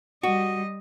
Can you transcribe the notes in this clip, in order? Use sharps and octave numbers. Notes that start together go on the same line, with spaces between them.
G3 F#4 D#5